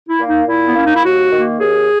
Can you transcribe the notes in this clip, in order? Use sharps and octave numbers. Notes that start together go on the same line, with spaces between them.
E4
A#3
D#4
A#2 E4
B3
A#3 C#4
D#4
E4
D#2 F#4
D#3 A#3
D#2 G#4